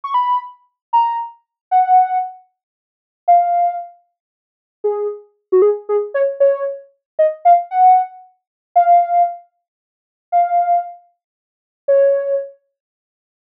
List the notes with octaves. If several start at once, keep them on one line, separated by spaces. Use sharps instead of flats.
C#6
B5
A#5
F#5
F5
G#4
F#4
G#4
G#4
C#5
C#5
D#5
F5
F#5
F5
F5
C#5